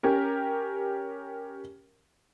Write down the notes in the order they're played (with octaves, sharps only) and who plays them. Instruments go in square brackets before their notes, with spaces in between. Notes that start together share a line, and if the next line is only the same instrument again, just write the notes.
[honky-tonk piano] C#4 G4 A#4